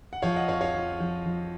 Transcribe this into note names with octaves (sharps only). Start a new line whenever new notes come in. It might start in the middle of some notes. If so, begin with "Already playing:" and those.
F#5
F3 C#5 F5
D#5 F#5
F2 C#5 F5
C#5 F5
F3
F3
F3